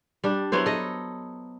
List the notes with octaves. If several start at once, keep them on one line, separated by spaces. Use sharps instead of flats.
G3 D4
F#3 B3 E4 C5
A4 D#5